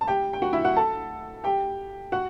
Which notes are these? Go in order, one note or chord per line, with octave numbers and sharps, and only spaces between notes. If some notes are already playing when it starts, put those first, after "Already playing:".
A5
G4 G5
G5
F#4 F#5
E4 E5
F#4 F#5
A4 A5
G4 G5
F#4 F#5